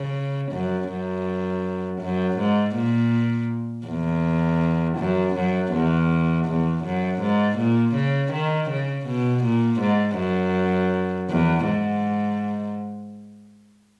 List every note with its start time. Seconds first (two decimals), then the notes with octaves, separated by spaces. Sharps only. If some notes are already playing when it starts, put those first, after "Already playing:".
Already playing: C#3
0.52 F#2
0.89 F#2
2.01 F#2
2.39 G#2
2.76 A#2
3.87 E2
4.98 F#2
5.36 F#2
5.73 E2
6.47 E2
6.84 F#2
7.21 G#2
7.58 A#2
7.95 C#3
8.32 D#3
8.70 C#3
9.07 B2
9.44 A#2
9.81 G#2
10.18 F#2
11.30 E2
11.67 G#2